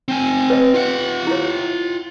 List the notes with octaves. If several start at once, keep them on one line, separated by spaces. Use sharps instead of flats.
C4 G#5
B4 C#5 D#5
F4 F#5
E4 C#5